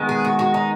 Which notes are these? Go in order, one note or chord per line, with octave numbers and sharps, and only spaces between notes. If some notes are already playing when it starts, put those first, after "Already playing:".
Already playing: D#3 G#3 B3
G#4
F#4
F#4
D#4